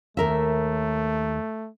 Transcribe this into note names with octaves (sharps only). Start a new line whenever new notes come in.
D#2 A3 A#4 E5